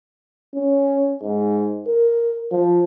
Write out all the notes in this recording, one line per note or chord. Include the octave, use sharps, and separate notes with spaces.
C#4
G#2
A#4
F3